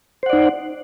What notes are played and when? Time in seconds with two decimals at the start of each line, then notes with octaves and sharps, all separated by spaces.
0.23 C5
0.26 F#5
0.30 D5
0.33 D#4